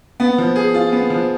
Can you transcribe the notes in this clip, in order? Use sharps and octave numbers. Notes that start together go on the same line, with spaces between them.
B3
F3
G#4
F4
B3
F3